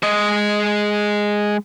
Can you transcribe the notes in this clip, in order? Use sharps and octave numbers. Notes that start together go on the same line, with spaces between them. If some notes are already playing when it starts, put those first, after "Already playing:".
G#3 D#5